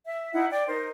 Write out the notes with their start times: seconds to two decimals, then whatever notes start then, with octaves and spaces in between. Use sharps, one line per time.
0.06 E5
0.33 D#4 E4 F#5
0.50 D5 G5
0.68 D#4 A#4 C5